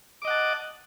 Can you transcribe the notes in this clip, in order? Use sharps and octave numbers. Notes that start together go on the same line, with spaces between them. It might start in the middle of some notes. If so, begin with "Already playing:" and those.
D#5 F#5 A5 D6